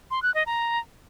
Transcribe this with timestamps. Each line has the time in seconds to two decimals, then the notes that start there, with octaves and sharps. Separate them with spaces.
0.11 C6
0.23 F#6
0.34 D#5
0.46 A#5